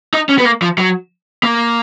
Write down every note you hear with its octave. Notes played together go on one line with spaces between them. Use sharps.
D#4
C#4
B3
A#3
F3
F#3
A#3